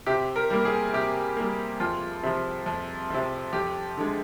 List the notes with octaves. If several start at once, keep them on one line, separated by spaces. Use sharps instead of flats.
C3 G4
A#4
G3 A#3
G#4
C3 G4
G3 A#3
F2 F4
C3 F3
F2
C3 F3
F2 G4
D3 G#3